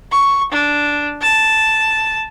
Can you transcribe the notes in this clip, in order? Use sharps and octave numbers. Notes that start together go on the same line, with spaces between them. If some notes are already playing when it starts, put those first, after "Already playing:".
C#6
D4
A5